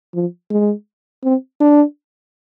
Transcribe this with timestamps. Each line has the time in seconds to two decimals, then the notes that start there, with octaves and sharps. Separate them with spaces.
0.14 F3
0.51 G#3
1.24 C4
1.61 D4